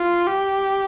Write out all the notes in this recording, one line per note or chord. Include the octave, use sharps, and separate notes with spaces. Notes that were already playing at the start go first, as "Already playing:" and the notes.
Already playing: F4
G4